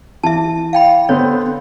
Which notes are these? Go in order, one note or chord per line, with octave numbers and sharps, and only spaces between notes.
E3 E5 A5
F5 G5 B5
D3 B3 C4 C#5